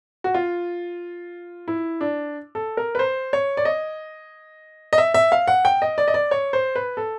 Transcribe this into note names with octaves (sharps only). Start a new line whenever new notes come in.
F#4
F4
E4
D4
A4
A#4
B4
C5
C#5
D5
D#5
D#5
E5
E5
F5
F#5
G5
D#5
D5
D#5
D5
C#5
C5
B4
A4